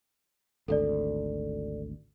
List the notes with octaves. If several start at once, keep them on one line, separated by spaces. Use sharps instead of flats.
G#1 D2 A4 D5